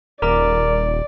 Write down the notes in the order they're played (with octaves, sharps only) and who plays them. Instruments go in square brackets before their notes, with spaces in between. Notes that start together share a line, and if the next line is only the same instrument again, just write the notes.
[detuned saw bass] D#1 [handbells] A#4 A#5 D6 [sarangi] D5